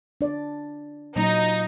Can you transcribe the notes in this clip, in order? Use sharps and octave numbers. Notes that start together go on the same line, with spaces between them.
D4 D5
A#2 F#3 A#3 D#4